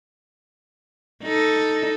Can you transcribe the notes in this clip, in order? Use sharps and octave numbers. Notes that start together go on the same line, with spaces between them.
D#4 A4